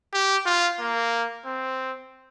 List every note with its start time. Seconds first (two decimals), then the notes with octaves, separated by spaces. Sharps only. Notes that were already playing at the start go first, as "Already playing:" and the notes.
0.13 G4
0.46 F4
0.80 A#3
1.46 C4